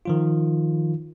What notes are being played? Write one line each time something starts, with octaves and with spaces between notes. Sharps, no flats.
D#3 F3 F4